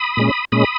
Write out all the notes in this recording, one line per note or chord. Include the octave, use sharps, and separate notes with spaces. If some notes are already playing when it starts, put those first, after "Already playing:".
Already playing: B5 D#6
A#2 G#3 C#4
A#2 G#3 C#4 B5 D#6